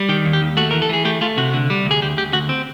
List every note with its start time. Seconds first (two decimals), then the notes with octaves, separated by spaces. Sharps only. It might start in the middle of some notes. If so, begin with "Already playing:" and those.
Already playing: G3
0.09 D#3 G4
0.25 D#2
0.33 G4
0.42 D#2
0.57 A3 F#4
0.71 E3 A#4
0.82 A4
0.89 E3 G#4
1.05 A3 G4
1.21 A3 F4
1.37 C3 F#4
1.53 D3
1.70 G3
1.86 D2
1.91 G#4
2.02 D2 G4
2.17 D2 G4
2.33 D2 F#4
2.49 C4